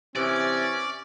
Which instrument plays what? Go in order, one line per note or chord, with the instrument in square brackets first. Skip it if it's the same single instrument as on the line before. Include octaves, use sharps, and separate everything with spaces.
[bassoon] C3 [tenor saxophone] E3 [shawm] C#4 [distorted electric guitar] D5